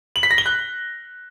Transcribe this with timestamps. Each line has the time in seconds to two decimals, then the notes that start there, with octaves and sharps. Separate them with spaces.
0.16 F#7
0.23 B6
0.31 A#6
0.38 G7
0.46 F#6